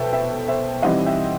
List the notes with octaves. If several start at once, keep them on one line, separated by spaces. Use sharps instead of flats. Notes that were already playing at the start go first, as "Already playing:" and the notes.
Already playing: B2 A4 B4 C5 E5 G5
E5 G5
C5 E5
E3 G3 C4 D#4 D#5 F#5
E5 G5